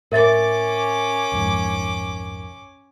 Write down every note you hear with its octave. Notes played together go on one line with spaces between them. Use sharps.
A2 C#4 A#4 E5 D6 A6
B1 F2 G#2